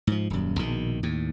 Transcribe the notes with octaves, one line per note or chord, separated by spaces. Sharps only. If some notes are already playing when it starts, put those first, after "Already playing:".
G#2 F3
D#1 F#2
A#1 B2 D#3
D#2 A2